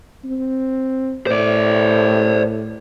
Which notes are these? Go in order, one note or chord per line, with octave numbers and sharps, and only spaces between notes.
C4
A2 C5 D5